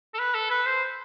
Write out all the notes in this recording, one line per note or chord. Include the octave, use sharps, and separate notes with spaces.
A4
B4
A4
B4
C5